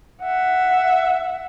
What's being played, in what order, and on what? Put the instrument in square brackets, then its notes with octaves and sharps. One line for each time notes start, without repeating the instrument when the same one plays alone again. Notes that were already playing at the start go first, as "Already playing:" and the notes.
[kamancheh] E5 F#5